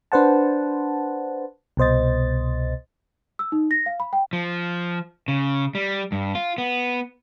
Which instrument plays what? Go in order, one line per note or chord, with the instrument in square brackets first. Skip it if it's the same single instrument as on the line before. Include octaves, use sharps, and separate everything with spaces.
[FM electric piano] D4 B4 C5 F#5 A5
C2 B2 C5 D#5 A6
[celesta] E6
D#4
A#6
F5
B5
G5
[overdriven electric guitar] F3
C#3
G3
G2
F4
B3